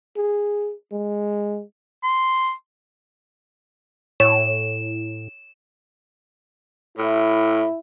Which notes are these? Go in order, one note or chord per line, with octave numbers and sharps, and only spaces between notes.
G#4
G#3
C6
A2 C#5 E7
A2 E4